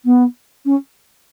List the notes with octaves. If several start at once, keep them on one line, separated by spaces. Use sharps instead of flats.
B3
C#4